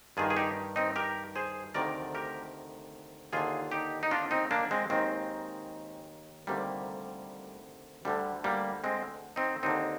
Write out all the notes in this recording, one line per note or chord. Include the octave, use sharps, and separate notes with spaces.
G2 D#3 F4 G#4
G#4
D#4 G4
C4 D#4
G4 A#4
G#4 C5
D2 C3 D#3 A#4 D5
G4 A#4
D#2 D3 F4 G#4
D#4 G4
D#4
D4 F4
C4 D#4
A#3 D4
G#3 C4
D#2 D#3 G#3 C4
D2 C3 D#3 G3 A#3
D2 D3 G3
G3 A#3
G#3 C4
C4 D#4
D#2 D3 C4 D#4